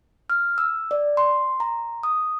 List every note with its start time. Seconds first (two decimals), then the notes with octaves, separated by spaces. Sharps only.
0.30 F6
0.58 E6
0.91 D5
1.17 C6
1.60 A#5
2.03 D#6